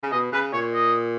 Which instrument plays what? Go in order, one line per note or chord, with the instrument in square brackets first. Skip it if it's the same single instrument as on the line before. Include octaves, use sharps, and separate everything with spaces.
[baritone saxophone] C#3
[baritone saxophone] B2 [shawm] D#5
[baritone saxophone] C#3 [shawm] B4
[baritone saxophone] A#2 [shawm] C#5
[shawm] D#5